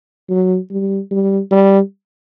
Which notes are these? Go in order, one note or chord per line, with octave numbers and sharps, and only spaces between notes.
F#3
G3
G3
G3